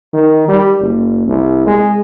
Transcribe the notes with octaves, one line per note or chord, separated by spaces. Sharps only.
D#3
G3
F#1
C2
G#3